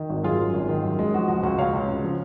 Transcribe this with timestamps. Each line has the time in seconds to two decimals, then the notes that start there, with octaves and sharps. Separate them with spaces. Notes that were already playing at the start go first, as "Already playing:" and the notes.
Already playing: D#3
0.10 G#1
0.23 F#2 F4 G#4
0.39 F#2
0.54 G#1
0.69 D#3
0.84 F#2
0.99 G#3
1.14 F3 F#4
1.28 C#2 F#4
1.43 C#2 F#4
1.58 C#2 C#5 F5
1.73 C#2
1.88 C#3
2.04 F3